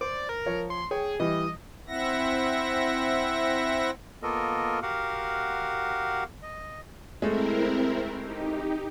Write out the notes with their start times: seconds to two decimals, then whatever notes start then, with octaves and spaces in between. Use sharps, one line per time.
0.01 C5 D5
0.29 A#4
0.46 F3 C#5
0.70 C6
0.91 G#4 C#5 G5
1.20 E3 G3 D#5
1.88 C4 E4 E5 F#5 A#6
4.23 A#3 B3 F4 A4 A#4 D#5
4.82 F#4 G4 A#4 F5 F#5
6.43 D#5
7.22 G#3 A3 C4 E4 A#4
8.21 D#4 G4